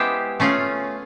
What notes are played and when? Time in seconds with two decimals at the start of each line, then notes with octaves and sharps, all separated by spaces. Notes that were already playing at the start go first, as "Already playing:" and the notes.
Already playing: G#3 B3 E4 G4 C5
0.40 A3 C#4 F4 G#4